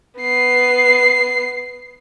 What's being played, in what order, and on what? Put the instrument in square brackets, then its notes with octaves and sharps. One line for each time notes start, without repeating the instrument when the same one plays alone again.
[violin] B3 C7